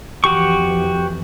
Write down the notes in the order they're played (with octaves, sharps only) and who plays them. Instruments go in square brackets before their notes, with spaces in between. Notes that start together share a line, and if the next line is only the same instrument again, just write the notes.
[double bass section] F2 E3 [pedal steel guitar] F#4 G4 C#6